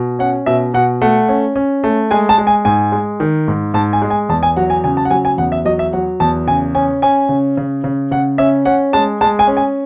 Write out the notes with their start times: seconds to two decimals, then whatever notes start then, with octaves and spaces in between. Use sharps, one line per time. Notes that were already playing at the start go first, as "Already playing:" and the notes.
Already playing: B2
0.19 C#4 F#5
0.46 B2 E5
0.74 B2 F#5
1.02 A3 F#5
1.29 C#4
1.56 C#4
1.84 A3
2.11 G#3 G#5
2.29 A5
2.38 G#3
2.47 G#5
2.65 G#2 G#5
2.92 G#3
3.20 D#3
3.48 G#2
3.74 G#2 A5
3.93 G#5
4.02 G#3
4.10 G#5
4.29 E2 A5
4.43 G#5
4.56 F#3 F#5
4.70 G#5
4.84 C#3 G#5
4.97 A5
5.05 F#5
5.10 F#3 G#5
5.25 G#5
5.38 E2 F#5
5.52 E5
5.65 F#3 D#5
5.79 E5
5.93 F#3 F#5
6.20 E2 A5
6.47 C#3 G#5
6.75 C#4 G#5
7.02 C#4 G#5
7.29 C#3
7.57 C#3
7.84 C#3
8.11 C#3 F#5
8.38 C#4 E5
8.65 C#4 F#5
8.93 G#3 A5
9.21 G#3 A5
9.39 G#5
9.47 C#4
9.57 G#5